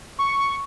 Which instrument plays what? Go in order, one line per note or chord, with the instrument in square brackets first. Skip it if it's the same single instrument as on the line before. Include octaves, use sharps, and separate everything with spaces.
[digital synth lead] C#6